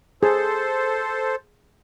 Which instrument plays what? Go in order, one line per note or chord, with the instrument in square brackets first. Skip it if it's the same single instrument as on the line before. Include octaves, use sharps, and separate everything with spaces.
[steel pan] G#4 [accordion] A4 C5